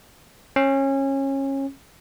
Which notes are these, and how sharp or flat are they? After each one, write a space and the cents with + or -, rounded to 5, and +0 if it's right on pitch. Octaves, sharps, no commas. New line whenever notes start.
C#4 -25